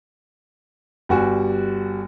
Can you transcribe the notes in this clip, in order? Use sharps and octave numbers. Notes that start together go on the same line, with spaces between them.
G1 G3 F#4 G#5